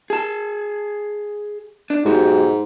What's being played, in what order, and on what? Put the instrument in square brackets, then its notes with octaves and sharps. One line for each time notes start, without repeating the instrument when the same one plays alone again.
[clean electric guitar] G#4 A5
D4
[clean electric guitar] B1 F#4 G4 [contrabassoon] G#2